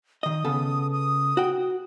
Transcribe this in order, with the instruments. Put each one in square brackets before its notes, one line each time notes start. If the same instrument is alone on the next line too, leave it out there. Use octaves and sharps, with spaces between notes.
[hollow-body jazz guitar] D#3 D#5 [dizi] D#6
[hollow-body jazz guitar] C#3 B3 A4
[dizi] D#6
[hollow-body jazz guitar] F#4 G5